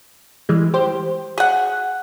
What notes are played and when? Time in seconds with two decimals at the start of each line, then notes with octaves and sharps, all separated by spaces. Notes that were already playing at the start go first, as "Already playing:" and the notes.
0.49 E3 G3 G#3
0.74 G4 C5
1.38 G#4 F#5